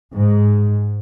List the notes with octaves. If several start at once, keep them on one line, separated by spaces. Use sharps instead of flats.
G#2